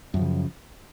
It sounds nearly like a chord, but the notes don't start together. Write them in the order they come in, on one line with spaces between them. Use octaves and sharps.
F#2 E3 F3 C#3